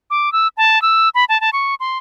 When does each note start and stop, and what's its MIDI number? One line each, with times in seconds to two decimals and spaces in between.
0.10 0.32 86
0.33 0.48 88
0.57 0.81 81
0.82 1.09 88
1.15 1.25 83
1.29 1.40 81
1.41 1.50 81
1.53 1.75 85
1.80 1.98 84